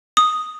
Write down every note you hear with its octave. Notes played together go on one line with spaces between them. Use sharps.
D#6